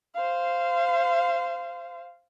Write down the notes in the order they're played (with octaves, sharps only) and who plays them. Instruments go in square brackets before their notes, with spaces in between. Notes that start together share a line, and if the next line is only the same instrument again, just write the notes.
[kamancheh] C5 F5